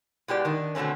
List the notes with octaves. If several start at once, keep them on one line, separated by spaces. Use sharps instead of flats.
B2 G#3 G4 D5
D#3 D4
B2 D3 A3 C4 C#4